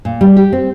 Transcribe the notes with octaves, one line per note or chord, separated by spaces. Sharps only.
A#2
G3
G4
C4